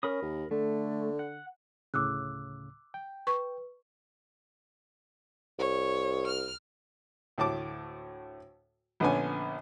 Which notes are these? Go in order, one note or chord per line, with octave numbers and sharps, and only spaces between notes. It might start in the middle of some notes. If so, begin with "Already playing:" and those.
C#4 A#4 B5 D#6
D#2
D3 A3
F#5
D2 A2 C#3 D6 E6 F#6
G5
B4 C#6
C2 C#5
F6
D2 A2 A5 D6
A#1 D3 B3 C#4 G#5